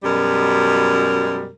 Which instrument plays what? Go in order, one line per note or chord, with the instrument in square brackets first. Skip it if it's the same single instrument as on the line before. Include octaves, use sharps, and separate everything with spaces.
[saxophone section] F#2 B2 G3 G#3 A#4